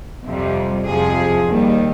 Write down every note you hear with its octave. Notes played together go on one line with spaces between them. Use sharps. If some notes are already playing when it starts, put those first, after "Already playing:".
F2 C3 G3
F2 C3 F3 G#4
D#2 D#3 G3